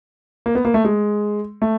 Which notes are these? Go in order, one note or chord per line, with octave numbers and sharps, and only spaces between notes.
A#3
B3
A#3
A3
G#3
A3